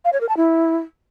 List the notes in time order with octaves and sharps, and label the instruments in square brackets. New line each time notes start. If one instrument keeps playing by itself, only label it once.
[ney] F5
C#5
A#4
A5
E4